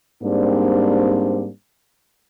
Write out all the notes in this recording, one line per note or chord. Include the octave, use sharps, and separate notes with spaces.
G#2 G3 A#3 C4 D4